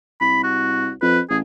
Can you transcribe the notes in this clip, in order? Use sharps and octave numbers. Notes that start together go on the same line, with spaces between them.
C2 B5
F#4
F2 B4
A1 G#4